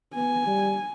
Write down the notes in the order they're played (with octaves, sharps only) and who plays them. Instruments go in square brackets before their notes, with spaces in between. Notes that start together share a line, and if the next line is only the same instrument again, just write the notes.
[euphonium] B3 [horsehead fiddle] G#5
[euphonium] G3